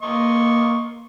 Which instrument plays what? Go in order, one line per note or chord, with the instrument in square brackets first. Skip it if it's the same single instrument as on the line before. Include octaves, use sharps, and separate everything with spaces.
[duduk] A#3 [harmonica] D#5 C6 C#6